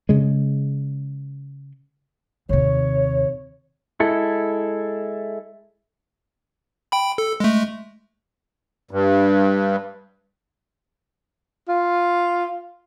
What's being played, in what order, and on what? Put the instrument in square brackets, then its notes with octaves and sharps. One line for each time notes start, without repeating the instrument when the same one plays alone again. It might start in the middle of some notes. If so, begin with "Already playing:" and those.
[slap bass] C#3 G#3
[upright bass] D#2 C3 [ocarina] C#5
[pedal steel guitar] G#3 E4 A4
[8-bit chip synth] G5 B5
A4
G#3 A3
[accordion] G2
[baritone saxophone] F4